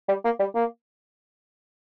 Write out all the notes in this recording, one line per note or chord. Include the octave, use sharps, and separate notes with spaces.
G3
A#3
G3
A#3